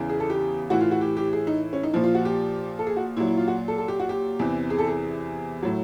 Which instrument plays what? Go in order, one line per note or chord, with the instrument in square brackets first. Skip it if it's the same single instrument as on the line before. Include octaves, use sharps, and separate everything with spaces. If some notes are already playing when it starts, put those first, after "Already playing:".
Already playing: [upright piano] E2 C#3 E3
G#4
A4
G4
A2 E3 F#4
F4
F#4
G4
G4
G#4
D#4
C#4
D#4
A#2 F3 E4
F4
F#4
G4
A4
G#4
F#4
A#2 F#3 E4
E4
F4
F#4
A4
A4
G4
F#4
G4
E2 C3 E3
G#4
A4
G#4
A2 F#3